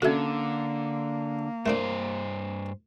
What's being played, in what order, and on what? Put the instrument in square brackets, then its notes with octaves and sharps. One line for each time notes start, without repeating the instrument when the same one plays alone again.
[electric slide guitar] D3 [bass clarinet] A#3 [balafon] C#4 A4 [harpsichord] F#4 E5
[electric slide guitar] G2 C5 [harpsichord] A3 C4 D4 [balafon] A#4